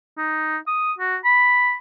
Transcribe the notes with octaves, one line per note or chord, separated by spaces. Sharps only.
D#4
D#6
F#4
B5